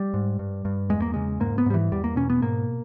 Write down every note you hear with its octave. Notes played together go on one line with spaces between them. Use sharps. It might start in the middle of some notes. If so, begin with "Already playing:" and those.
Already playing: G3
G#2
G2
G2
E2 G#3
A#3
C#3 G#3
G#2 A#3
B3
G#2 G3
E3
E2 G3
A#3
B2 C#4
B3
G#2 A#3